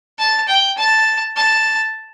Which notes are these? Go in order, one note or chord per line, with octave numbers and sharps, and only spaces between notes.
A5
G5
A5
A5